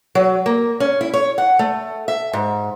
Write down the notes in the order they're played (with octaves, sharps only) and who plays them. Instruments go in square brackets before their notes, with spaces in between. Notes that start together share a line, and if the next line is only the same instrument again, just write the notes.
[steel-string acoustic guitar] F#3
A#3
C#4
E4
C#5
F#5
A3
E5
G#2